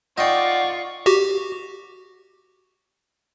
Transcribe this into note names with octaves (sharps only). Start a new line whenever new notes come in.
D#4 F4 D5 F#5 G5 C#6
F#4 G4